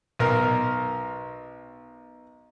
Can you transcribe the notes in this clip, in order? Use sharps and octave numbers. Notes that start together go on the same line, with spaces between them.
B1 A#4